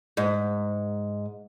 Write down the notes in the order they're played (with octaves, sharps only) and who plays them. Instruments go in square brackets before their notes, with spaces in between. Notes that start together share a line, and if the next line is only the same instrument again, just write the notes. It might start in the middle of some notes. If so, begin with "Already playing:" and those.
[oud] G#2